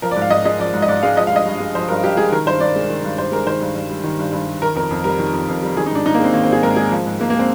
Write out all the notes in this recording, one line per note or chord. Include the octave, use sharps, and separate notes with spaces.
F3 A#4
D5
G#2
F5
G#2 D#5
G#3 D#5
F3 D5
G#2
D#5
G#2 D5
G#3 F5
F3 D#5
F5
G2 D#5
G2
G#3
F3 C5
G2 A#4
G2 G4
G#3 G#4
D#3 A#4
G2 C5
G2 D5
G#3
D#3
G2
G2 C5
G#3 A#4
D#3 C5
G2
G2
G3
D#3
G2
G2
G3
D#3 A#4
F2 A#4
F2
G3 A#4
D#3
F2
F2
G3
D#3 G#4
D#4
G#2 D4
G#2 D#4
A#3
G#3 C4
D#3 A#3
C4
G#2 G#4
G#2 A#4
G#3 G#4
F3
G#2
G#2 A#3
A#3
G#3 C4